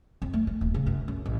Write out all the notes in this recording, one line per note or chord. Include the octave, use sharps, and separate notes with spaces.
F2
A3
A3
D#1
C#3
F#2
F#2
A1